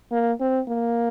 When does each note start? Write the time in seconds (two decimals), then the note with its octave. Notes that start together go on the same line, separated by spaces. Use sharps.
0.12 A#3
0.40 C4
0.68 A#3